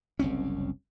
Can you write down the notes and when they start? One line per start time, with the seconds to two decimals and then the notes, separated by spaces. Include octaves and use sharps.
0.19 F#1 C2 C4 C#4